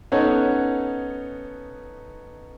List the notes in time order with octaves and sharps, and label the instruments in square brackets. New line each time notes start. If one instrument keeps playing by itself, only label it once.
[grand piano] B3 C#4 D#4 A4 C#5 F#5